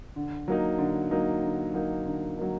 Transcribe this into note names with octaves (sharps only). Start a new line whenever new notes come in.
D3
F#3 A#3 D#4
D3
F#3 A#3 D#4
D3
F#3 A#3 D#4
D3
F#3 A#3 D#4